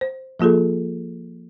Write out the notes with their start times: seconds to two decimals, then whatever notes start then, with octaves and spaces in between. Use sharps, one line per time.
0.01 C5
0.40 F3 A#3 F4 G#4 A4